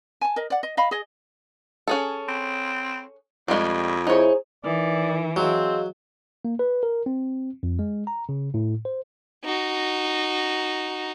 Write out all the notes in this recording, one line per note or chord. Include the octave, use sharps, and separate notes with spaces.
G#5 A5
A#4 D#5
D5 F#5
D#5
D#5 F5 B5
G#4 D#5
C#4 G#4 A4
C4
F2 G3 G#3
D#4 E4 G#4 C5 C#5
E3 D#4 A#4 D5
F#3 C4 G#4 D#5 F5
A#3
B4
A#4
C4
F2
G#3
A#5
C#3
A2
C5
D#4 F#4